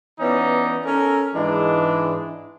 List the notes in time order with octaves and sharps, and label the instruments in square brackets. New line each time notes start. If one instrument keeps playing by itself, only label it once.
[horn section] E3 B3 C#4 D#4 D5
C#4 A4 A#4
G#2 E3 G#3 D4